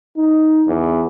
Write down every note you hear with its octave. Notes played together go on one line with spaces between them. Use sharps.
D#4
E2